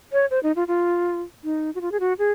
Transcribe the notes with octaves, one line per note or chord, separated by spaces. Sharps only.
C#5
C5
D#4
F4
F4
D#4
F#4
F4
G#4
F#4
G#4